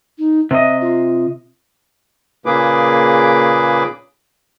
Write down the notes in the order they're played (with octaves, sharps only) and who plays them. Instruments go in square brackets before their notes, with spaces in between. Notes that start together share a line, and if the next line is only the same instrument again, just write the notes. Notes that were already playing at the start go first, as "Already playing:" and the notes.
[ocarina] D#4
[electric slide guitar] C3 D#5 [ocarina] E5
[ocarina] F4
[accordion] A#2 C#3 A#3 G#4 B4 D6